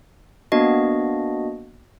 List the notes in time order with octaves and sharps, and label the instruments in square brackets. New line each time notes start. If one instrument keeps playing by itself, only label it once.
[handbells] A#3 B3 D4 F#4 D#5